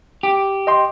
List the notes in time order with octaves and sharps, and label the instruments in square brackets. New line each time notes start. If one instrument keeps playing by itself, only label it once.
[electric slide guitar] G4
[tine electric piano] D#5 G5 C6